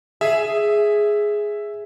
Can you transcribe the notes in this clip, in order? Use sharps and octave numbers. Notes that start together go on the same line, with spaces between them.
G#4 E5